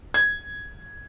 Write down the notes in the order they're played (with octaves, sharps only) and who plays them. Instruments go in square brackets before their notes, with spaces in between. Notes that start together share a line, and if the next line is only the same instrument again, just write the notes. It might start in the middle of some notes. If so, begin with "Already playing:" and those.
[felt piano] G#6